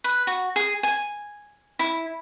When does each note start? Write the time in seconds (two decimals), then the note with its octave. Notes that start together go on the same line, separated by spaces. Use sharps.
0.04 B4
0.27 F#4
0.56 G#4
0.83 G#5
1.79 E4